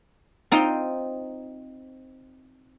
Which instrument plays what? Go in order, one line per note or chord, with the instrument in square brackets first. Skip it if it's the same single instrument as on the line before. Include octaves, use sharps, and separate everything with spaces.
[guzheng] C4 D#4 F4 G5